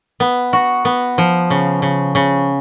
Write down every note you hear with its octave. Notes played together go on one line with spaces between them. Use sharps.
B3
F#4
B3
F3
C#3
C#3
C#3